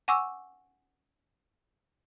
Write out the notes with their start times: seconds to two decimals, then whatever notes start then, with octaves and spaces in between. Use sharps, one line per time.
0.08 F#5 G#5 C#6 D6 E6